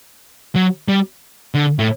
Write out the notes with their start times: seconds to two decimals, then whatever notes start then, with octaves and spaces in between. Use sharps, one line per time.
0.55 F#3
0.88 G3
1.54 D3
1.79 A2